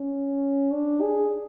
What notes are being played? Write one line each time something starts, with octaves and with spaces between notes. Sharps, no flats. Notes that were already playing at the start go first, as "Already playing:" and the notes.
Already playing: C#4
D4
G#4